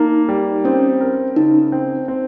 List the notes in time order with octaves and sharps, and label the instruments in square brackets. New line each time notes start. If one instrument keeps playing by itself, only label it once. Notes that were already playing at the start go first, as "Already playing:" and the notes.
Already playing: [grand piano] A#3 [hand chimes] D#4
[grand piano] G3
[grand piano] C4 [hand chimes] C#4
[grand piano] A#4
[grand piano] C#3 [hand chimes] D#4
[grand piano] C4
C4